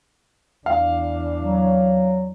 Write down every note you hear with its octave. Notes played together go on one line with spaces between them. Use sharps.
E2 D4 F5
F#3